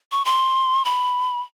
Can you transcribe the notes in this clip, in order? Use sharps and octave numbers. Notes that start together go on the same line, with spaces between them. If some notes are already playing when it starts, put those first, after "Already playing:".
C#6
C6
B5